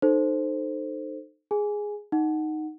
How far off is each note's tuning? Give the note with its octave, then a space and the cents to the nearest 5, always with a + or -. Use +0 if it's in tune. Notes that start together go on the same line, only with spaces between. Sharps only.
D#4 -30 A4 +0 C5 +0
G#4 +0 G#5 +0
D#4 +0 F#5 +0